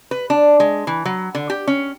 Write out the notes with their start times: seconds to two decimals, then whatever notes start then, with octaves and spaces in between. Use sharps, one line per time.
0.11 B4
0.30 D4
0.60 G#3
0.87 E3
1.05 F#3
1.35 D3
1.50 G4
1.67 C#4